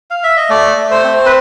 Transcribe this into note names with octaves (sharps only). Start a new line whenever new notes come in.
F5
E5
D#5
A3 D5
A3
C5
C4
B4